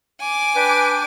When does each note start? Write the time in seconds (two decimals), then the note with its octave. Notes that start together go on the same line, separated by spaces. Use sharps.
0.21 G#5 D6
0.56 D4 B4 G5